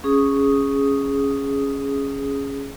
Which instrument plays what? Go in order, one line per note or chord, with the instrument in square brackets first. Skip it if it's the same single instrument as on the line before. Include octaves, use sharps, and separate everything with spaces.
[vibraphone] C#4 G#4 D#6